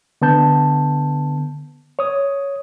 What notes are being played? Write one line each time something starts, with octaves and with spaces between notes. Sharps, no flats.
D3 B3 A5 G6
C#5 D#6